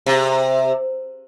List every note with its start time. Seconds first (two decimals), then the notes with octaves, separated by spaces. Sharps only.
0.06 C3